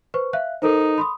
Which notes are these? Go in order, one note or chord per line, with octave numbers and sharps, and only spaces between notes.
B4 C5 C#6
E5 F5 F#6
D#4 A4 A#4 C5
B5 C6 D#6